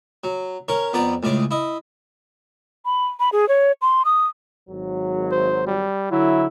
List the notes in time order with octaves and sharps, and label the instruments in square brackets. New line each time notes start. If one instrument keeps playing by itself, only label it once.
[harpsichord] F#3
C#4 A#4 C#5
F2 B3 D5 A#5
C#2 A2 G#4 D6
E4 D#5
[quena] B5
B5
G#4
C#5
C6
D#6
[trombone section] G#1 F#3
[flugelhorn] C5
G3
[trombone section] D3 E4 [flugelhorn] F#3